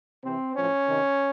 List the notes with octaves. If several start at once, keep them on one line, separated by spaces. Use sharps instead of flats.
C3 E3 C4
A2 F3 C#4
C3 D#3